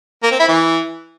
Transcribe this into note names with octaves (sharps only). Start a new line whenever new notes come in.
A#3
C4
E4
E3